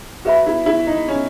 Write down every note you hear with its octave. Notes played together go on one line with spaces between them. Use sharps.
F#4 B4 E5 B5
E4
E4
D#4
C#4